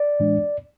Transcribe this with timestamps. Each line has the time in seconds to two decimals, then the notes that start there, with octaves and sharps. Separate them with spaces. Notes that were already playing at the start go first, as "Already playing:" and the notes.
Already playing: D5
0.20 A2 E3 G#3 D4